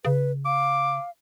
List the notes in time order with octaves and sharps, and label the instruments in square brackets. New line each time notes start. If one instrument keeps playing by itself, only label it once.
[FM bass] C#3 [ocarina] B4
[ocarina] F5 [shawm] D6